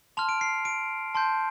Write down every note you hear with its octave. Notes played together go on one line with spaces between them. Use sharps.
A5 C6 F6 F7
D7
C7
D7
A5 C6 G6